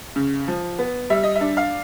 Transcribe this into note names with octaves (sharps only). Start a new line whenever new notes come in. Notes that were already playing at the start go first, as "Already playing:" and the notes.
C#3
F3
B3
G3 E5
D#5
E5
D4
F5